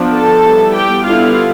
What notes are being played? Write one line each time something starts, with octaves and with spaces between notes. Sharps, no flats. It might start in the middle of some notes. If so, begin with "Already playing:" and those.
Already playing: F3 B3 D4
A4 A5
G3 B3 E4
G4 G5
D3 G3 B3 E4 F4 F5